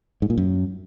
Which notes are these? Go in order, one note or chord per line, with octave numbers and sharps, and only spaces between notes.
G#2
A#2
F#2